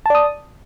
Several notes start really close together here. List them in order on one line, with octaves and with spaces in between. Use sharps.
A5 D5 D#6